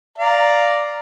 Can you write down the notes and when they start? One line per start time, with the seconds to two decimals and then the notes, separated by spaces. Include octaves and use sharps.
0.18 D5 F5 A#5